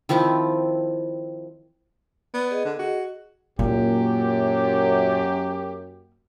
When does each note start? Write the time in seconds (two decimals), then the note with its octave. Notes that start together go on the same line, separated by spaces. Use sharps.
0.09 D#3 F3 C4 E4
2.34 B3 D5
2.51 G#4 D#5
2.65 D3
2.79 F#4
3.59 F#2 A#2 A#3 D#4 G4